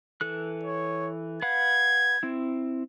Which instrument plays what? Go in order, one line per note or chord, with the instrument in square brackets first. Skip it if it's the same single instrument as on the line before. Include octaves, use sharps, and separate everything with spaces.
[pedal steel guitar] E3 A4 F#6
[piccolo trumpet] C#5
[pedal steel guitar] B4 F5 F#5 [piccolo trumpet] G#6
[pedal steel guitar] C4 E4